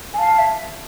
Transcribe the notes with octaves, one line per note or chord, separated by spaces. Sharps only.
G#5
F5 A5
E5